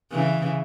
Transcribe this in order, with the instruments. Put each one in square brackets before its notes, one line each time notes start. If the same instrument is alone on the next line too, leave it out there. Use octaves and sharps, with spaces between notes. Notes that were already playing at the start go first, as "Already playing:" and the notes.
[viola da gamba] C#3 E3